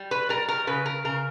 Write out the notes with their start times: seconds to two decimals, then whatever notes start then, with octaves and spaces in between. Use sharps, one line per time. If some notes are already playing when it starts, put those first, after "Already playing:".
Already playing: G3
0.11 B4
0.29 G3 A#4
0.48 A#4
0.67 C#3 B4
0.86 A#4
1.05 C#3 A#4